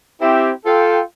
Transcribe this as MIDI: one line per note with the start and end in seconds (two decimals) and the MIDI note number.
0.21 0.50 60
0.21 0.50 64
0.21 0.50 67
0.65 0.99 65
0.65 0.99 69
0.65 0.99 79